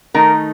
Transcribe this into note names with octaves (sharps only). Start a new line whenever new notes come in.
D#3 A3 D#4 A#4